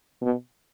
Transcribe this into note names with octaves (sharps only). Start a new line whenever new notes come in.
B2